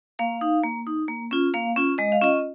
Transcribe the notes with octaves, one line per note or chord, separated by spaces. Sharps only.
A#3 F5
D#4
A#3
D#4
A#3
C#4 F4
A#3 F5
C#4 F4
G#3 D#5
F5
C#4 F4 D#5